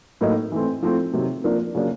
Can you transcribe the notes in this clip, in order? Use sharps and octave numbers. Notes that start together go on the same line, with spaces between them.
A2 F#3 A#3 D#4
E3 A3 C4
F3 A3 C4 E4
C3 D#3 F#3
F3 A#3 D4
C#3 F#3 A#3 D4